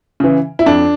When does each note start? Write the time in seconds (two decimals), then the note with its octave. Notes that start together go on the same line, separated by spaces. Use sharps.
0.20 C#3 E3
0.59 E4
0.66 F2 D4